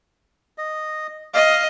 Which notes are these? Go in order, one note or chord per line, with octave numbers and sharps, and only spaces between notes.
D#5
D#5 F5